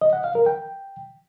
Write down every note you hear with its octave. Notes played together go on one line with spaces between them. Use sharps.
D#5
F#5
F5
A#4
G5